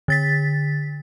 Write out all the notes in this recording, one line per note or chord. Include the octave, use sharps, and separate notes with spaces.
D3 A6 B6